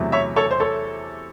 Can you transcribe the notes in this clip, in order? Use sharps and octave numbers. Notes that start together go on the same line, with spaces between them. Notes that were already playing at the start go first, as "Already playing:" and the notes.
Already playing: E2 C3 F#3 A3
C#5 E5
A4 C#5
C5
A4 C#5